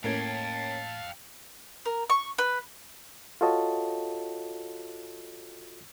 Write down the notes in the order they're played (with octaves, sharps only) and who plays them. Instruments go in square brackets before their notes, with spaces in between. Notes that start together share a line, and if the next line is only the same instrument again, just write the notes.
[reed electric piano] A2 G#6 [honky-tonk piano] A#3 C#4 A#4 [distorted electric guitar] F5 G5 [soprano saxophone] A5
[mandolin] A#4
C#6
B4
[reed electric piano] F4 F#4 A4 C#5 D#5 A5